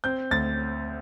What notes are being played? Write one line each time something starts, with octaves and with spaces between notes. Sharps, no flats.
C4 G6
D2 A6